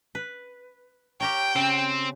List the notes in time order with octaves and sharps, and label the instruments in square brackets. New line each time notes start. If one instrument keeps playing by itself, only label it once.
[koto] B4
[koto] G4 A#4 C#5 [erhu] G5
[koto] C#3 [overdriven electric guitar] C4